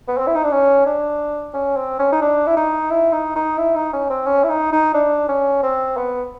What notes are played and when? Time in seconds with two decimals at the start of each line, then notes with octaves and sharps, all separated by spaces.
0.08 B3
0.18 C4
0.27 E4
0.35 D#4
0.43 D4
0.52 C#4
0.86 D4
1.54 C#4
1.76 C4
1.99 C#4
2.12 D#4
2.21 D4
2.47 E4
2.57 D#4
2.90 E4
3.12 D#4
3.35 D#4
3.58 E4
3.75 D#4
3.93 C#4
4.09 C4
4.26 C#4
4.44 E4
4.49 D#4
4.72 D#4
4.94 D4
5.28 C#4
5.63 C4
5.97 B3